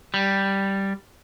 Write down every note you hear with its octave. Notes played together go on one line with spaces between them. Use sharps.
G3